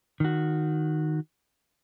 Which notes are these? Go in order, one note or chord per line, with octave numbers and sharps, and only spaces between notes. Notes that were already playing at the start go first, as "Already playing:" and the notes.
D#3 F#4